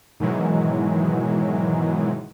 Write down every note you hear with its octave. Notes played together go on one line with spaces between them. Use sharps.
G#2 B2 D#3 E3 F#3 G#3